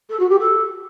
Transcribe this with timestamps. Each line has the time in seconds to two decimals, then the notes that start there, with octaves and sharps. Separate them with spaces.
0.09 A4
0.19 F#4
0.29 G4
0.39 A4